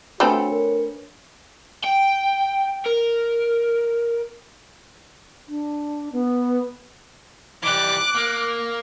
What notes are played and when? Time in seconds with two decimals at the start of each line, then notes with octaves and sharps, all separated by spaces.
0.20 A3 C4 D4 F#4 B4 C#5 B5
0.51 A#4
1.84 G5
2.86 A#4
5.48 D4
6.13 B3
7.63 E3 G3 D6 F#6
8.15 A#3